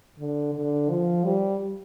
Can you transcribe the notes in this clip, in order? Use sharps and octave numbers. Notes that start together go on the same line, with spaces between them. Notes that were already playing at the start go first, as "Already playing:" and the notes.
D3
D3
F3
G3